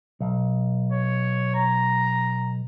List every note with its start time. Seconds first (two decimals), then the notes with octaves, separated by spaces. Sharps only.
0.20 B1
0.92 C#5
1.55 A#5